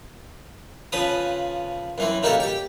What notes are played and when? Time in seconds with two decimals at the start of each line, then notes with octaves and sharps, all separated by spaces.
0.92 C#3 F3 B4 D#6
1.98 F#2 E3 C4
2.23 C#3 A#3 D#4 F#4 G4 A4
2.40 G4 G5